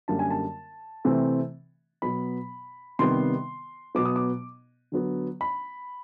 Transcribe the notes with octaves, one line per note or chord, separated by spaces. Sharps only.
F#2 D3 G3 A#3 A5
G#5
A5
C3 E3 A3 C4
B2 F#3 B3 B5
C3 D#3 G3 B3 C6
B2 F#3 B3 D6
D#6
D6
D3 F#3 B3
B5